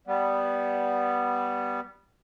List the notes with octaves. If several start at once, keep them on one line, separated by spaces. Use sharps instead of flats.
G3 B3